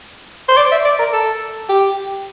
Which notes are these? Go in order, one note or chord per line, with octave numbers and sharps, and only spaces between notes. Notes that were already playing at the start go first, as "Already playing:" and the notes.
C5
D5
E5
D5
A#4
A4
G4